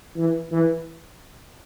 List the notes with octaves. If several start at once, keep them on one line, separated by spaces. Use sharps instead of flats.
E3
E3